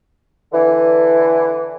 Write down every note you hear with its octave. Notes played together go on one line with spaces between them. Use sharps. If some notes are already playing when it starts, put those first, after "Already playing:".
D3 E3